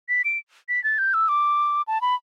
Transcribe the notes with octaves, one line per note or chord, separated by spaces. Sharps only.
B6
D7
B6
A6
G6
E6
D6
A5
B5